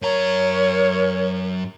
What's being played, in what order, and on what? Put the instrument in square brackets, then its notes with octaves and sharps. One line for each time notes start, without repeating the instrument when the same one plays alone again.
[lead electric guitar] F#2 A#5 [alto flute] A#4 [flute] C#5